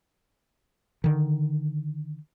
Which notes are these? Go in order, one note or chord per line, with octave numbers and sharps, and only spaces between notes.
D3 D#3